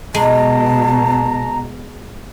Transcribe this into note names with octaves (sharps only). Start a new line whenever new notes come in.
B2 G#3 A5 A#5